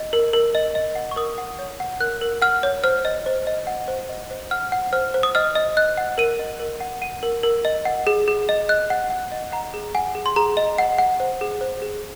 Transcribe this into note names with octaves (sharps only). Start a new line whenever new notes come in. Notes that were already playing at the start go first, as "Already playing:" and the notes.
Already playing: D#5
A#4
A#4
D#5
D#5
F#5
C#6
A#4 D#6
F#5
C#5
F#5
A#4 F#6
A#4
F#5 F6
C#5
C5 F6
D#5
C5
D#5
F#5
C5
D#5
C5
F#5 F6
F#5
C5 F6
C5
D#6
D#5 F6
D#5
D#5 F#6
F#5
A#4 D#7
D#5
A#4
F#5
F#5 D#7
A#4
A#4
D#5
F#5
G#4
G#4
D#5
D#5 F#6
F#5
F#5
D#5
F#5 A#5
G#4
F#5 G#5
G#4
C6
G#4 A#5
D#5
F#5
F#5
C5
G#4
C5
G#4